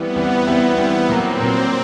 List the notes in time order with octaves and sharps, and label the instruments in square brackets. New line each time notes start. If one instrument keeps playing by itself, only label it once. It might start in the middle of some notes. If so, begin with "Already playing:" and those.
Already playing: [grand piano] E3 G3 C4 E4 [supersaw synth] B3
[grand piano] E3 G3 C4 E4
[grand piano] E3 G3 C4 E4 [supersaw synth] B3
[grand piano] E3 G3 C4 E4
[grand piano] A#2 F#3 A#3 [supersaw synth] C4
[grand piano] A#2 F#3 A#3